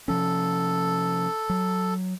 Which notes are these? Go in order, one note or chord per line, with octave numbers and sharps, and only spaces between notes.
C3 F3 C#4 A4
F#3